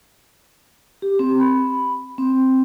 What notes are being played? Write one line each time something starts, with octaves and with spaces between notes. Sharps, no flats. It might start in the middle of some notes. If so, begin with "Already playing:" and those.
G4
C4
B5
C4